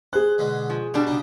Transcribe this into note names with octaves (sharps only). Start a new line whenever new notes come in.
G#4 C5 F#6
B2 D3 G#3
F3
B2 G3 D4 G4
C#3 D#4